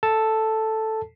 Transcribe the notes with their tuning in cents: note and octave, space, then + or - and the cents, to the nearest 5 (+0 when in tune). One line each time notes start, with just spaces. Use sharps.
A4 +0 A5 +0